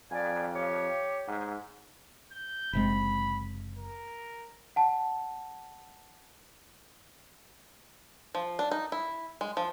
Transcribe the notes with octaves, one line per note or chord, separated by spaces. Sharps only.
F2 D5 G#5
G4 C#5
G#2
G6
F#1 C3 G#3 B5
A#4
F#5 A5
F3
D4
D#4
E4
G#3
F3